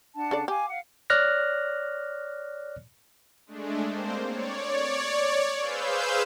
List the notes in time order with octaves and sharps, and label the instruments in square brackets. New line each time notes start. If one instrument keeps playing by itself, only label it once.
[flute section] D4 F#5 A5
[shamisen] C#3 A4 D5
[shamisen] G4 [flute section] F5 G#5 D6
[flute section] F5 F#5
[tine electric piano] C#5 D5 F6 F#6 A#6
[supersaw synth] G#3 A3 D4
A#3 C4 C5
C#5 D5
G#4 B4 C5 F5 E6 G6